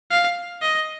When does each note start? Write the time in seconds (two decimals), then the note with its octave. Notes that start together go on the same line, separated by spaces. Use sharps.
0.11 F5
0.62 D#5